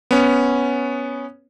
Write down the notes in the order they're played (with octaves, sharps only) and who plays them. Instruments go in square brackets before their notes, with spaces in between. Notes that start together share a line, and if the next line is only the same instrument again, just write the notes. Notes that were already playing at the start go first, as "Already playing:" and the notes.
[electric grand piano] B3 C#4